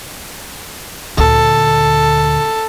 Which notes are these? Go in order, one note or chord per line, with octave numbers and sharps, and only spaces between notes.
D2 A#2 A4